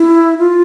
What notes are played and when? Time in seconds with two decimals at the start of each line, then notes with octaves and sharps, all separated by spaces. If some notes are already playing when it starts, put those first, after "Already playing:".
Already playing: E4
0.38 F4